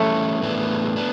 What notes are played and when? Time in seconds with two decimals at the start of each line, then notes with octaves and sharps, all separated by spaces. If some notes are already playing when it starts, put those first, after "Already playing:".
Already playing: E3 G3 A3 C#4
0.42 A2 E3 B3 D4
0.96 B3 D4